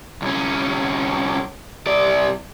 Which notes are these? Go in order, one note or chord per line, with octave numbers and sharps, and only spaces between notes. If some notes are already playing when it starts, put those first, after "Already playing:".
C2 C#4
C2 D5